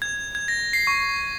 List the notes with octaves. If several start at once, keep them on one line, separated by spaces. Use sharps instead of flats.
G#6
G#6
A#6
C7
C#6